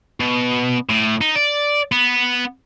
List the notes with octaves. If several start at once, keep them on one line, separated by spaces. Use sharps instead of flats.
B2
A2
D#4
D5
B3